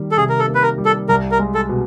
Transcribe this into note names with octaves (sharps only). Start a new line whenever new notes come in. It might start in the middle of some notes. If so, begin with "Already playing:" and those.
Already playing: D#3 G3 A#3
A4
C3 G#4
A#4
A4
A#3
B4
A#4
G3
A4
C2 A#4
A#4
G#3
A4
B2